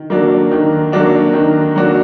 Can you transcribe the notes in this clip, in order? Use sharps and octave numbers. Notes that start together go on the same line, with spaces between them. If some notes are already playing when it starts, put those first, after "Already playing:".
Already playing: D#3
F#3 A#3 D4 F#4
D#3
F#3 A#3 D4 F#4
D#3
F#3 A#3 D4 F#4